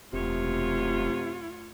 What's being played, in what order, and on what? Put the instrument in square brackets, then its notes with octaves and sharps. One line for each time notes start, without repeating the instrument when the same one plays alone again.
[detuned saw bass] E1 [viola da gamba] F#2 A3 C#5 [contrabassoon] C3 [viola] F4